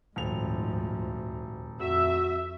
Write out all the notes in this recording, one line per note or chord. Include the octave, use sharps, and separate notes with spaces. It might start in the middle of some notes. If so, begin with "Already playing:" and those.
D#1 D2 G#2 F3 F7
F2 F#4 E5